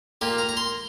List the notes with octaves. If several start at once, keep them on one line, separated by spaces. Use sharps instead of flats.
A#2 A#3 G4
A#5
A#5
C6